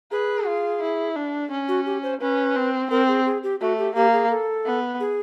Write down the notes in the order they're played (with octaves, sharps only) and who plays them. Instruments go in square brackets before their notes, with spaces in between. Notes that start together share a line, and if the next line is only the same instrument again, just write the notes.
[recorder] G#4 [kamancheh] B4
[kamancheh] F4
E4
D4
C#4
[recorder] F#4
G4
C5
[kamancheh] C#4 [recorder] B4
[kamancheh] C4
[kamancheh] C4 [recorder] A#4
[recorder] G#4
G#4
G4
[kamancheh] A3 [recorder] F#4
[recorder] G4
[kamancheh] A#3 [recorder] G4
[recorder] G#4
A4
[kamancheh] B3
[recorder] G#4